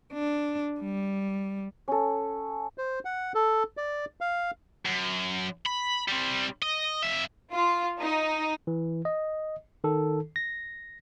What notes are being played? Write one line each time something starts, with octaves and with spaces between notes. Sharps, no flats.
D4
G3
C#4 A4
C5
F#5
A4
D5
F5
F#2
B5
G3 C4
D#5
F2 E5
F4
D#4
E3
D#5
D#3 A4
A#6